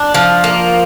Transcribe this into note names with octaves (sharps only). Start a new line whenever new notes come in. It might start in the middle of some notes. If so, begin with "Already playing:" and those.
Already playing: D4
F3
A#3